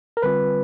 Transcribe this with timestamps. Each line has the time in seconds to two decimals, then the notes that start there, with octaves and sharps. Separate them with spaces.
0.17 A#4
0.23 D3 G3 C4 F4 B4